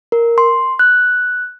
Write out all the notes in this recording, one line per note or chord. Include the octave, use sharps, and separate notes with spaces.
A#4
C6
F#6